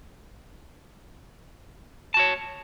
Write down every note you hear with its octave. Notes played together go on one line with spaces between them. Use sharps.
F#4 C#5 A5